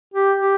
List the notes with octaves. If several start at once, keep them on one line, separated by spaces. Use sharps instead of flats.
G4
G4